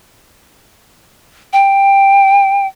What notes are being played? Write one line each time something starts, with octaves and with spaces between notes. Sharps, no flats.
G5